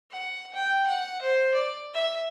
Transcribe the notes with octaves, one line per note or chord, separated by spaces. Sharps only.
F#5
G5
F#5
C5
D5
E5